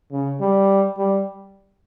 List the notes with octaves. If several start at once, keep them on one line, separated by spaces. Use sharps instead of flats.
C#3
G3
G3